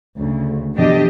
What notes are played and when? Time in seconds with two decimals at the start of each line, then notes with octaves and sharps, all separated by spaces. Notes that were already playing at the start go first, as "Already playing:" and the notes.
0.18 D2 C#3
0.75 F2 B2 E3 D4 G4 D#5